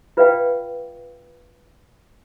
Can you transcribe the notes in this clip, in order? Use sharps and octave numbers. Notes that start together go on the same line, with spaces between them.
F4 B4 D5 E5 F5 G5